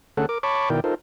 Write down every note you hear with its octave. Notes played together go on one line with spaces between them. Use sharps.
D3 A3 C#4 G#4 A4 F#5
A#4 D6
C#5 A5 B5 C#6 D6
B2 D#3 E4 A#4 D5 G5
D#4 F4 A4 A#4 C5